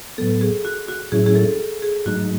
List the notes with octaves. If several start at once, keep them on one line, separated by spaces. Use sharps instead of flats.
A2 F#3 B3 A4
G#4
F#4
F#4
A2 F#3 C#4 E4 G#4
G#4
A4
G#4
G#2 F#3 A3 D#4 F#4